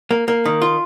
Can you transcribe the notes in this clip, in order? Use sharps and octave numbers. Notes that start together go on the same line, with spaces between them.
A#3
A#3
D#3
F4